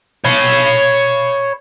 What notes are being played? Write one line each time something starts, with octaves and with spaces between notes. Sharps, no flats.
C#5 B5